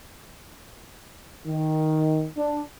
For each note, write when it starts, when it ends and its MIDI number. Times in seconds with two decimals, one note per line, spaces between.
1.47 2.27 51
2.37 2.62 62